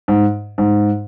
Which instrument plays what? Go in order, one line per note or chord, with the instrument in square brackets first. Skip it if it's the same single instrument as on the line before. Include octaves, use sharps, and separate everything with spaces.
[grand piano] G#2
G#2